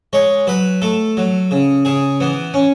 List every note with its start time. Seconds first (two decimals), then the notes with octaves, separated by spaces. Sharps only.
0.13 G#3 C#5
0.47 F#3 B4
0.82 A3 A4
1.17 F#3
1.51 C#3
1.85 C#3 G#4
2.20 E3 B3
2.54 C#4